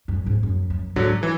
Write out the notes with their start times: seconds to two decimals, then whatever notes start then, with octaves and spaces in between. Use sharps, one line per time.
0.08 F#2
0.26 G#2
0.43 F#2
0.70 F#2
0.96 G#2 D3 F#3
1.23 E3